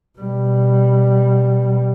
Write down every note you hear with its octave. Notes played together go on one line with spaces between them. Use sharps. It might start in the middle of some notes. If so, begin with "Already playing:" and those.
B2 G3